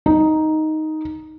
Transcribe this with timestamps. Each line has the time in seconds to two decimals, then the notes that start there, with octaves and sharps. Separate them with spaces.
0.06 D#4